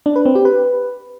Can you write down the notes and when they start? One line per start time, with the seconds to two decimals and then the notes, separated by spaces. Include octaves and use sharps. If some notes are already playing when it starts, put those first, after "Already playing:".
0.06 D4
0.16 B4
0.25 C4
0.35 G4
0.45 B4